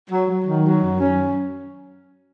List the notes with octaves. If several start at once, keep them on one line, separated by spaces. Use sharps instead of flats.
F#3
F#3
D#3
F#3
F#2
C#4